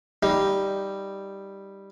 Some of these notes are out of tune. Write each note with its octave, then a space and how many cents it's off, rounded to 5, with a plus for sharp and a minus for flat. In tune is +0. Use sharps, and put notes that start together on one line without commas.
G3 +0 D#4 +5